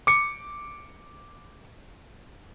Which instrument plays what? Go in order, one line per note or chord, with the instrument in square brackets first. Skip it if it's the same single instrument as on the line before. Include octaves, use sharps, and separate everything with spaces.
[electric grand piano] D6 C#7